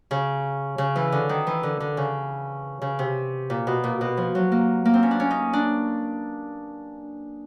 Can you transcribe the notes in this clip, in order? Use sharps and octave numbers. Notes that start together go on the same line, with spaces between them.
C#3
C#3
E3
D3
D#3
E3
D3
D3
C#3
C#3
C3
A#2
B2
A#2
B2
F3
F#3
A#3
A#3
C4
C#4
D4
C#4
D#4
D4